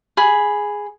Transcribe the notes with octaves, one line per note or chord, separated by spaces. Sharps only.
G#4 B5